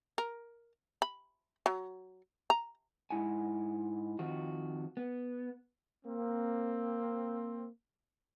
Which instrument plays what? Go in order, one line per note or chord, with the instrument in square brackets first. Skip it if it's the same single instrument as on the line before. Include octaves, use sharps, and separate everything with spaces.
[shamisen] A#4
B5
F#3
A#5
[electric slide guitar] G#2 B3 E4 F#5 G#5
F2 D#3 F4 F#4
B3
[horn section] A#3 C4